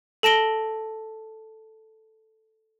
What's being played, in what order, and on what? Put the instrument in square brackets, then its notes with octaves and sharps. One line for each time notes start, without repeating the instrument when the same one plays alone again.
[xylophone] A4 A5 A#6 D7 G7